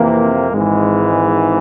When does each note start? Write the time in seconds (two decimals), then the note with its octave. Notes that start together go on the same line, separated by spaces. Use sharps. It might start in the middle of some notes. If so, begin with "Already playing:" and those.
Already playing: F2 C3 E3 A#3
0.51 G#1 G#2 E3 G#3